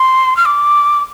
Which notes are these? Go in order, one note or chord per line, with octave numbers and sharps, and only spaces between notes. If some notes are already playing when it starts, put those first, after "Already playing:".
Already playing: C6
F6
D6